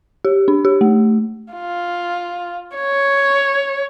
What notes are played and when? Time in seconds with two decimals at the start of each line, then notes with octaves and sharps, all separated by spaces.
0.25 G4
0.48 D4
0.65 G4
0.81 A3
1.53 F4
2.76 C#5